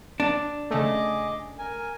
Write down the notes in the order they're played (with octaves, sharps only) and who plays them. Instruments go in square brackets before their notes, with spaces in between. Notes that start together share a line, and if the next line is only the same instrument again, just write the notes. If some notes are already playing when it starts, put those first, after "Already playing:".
[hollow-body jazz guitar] D4
[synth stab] C#3 A3 [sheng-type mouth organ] G#4 D#5 D6
[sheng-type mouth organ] A#4 G#5